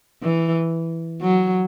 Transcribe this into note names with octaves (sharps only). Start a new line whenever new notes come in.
E3
F#3